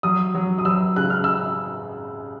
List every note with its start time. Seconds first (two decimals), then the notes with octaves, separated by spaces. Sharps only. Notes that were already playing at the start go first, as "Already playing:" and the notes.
0.03 F#3 D#6
0.35 F#3
0.59 D#6
0.65 F#3 E6
0.96 C#3 F#6
1.10 F6
1.24 E6